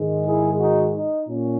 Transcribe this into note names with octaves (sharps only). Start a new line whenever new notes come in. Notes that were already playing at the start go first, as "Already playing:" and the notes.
Already playing: G#2 D#3 G#3
E4 G#4
D#4 F#4
D#4
A#2 C#4